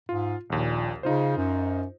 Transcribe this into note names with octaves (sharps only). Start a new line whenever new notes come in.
G#2 F4
A#1 D#2 A#2
C#3 D#4 F4 C5
F#2